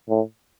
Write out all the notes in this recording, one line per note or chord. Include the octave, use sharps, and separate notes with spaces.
A2